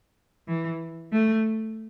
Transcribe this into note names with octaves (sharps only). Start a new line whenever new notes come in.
E3
A3